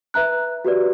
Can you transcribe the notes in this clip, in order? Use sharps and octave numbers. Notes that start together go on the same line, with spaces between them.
B4 E5 A#5 F#6
F#4 G4 B4 D5